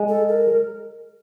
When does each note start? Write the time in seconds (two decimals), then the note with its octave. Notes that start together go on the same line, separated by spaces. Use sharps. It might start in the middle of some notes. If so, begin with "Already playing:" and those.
Already playing: G#3
0.08 A4
0.29 A#4